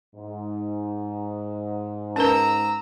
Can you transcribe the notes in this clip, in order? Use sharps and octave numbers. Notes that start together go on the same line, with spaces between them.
G#2
C#4 A#4 B4 A#5 E6